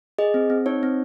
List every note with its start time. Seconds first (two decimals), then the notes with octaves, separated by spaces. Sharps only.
0.18 G#4 D#5
0.34 C4
0.50 C4
0.66 D#4 C#5
0.83 C4